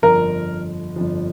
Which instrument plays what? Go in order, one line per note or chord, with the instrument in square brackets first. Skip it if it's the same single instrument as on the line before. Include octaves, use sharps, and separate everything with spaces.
[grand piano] G1 F2 F3 [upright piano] A#4
[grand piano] G1 F2 F3